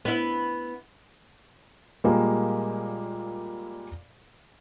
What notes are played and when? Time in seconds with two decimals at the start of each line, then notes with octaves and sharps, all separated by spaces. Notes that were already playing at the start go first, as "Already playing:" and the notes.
0.05 B3 E4
2.04 A#2 G3 G#3 A#3